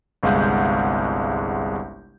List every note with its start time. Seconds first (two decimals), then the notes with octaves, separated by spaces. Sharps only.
0.23 G1 C2 G#3 F5 F#5 G6